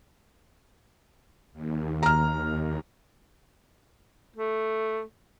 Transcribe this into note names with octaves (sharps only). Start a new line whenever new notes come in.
D#2
A#5 F6
A3